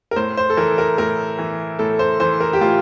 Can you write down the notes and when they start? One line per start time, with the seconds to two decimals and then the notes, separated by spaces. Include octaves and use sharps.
0.11 A#4
0.16 A2 C5
0.37 C5
0.50 A4
0.57 E3 A#4
0.78 A#4
0.98 A2 A#4
1.39 E3
1.79 A2 A4
1.99 C5
2.20 E3 C5
2.40 A#4
2.53 G4
2.61 A2 F4